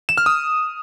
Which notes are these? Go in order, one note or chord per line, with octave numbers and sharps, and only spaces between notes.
E7
F6
D#6